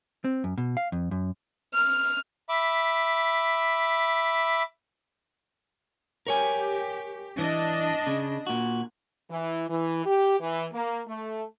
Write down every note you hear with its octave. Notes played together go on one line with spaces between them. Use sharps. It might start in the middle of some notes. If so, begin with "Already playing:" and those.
C4
F#2
B2
F5
F2
F#2
F6
E5 B5 D6
G4 A#4 C#5 G#5
E3 D4 D#5
C#3
A#2 F#4
E3
E3
G4
E3
A#3
A3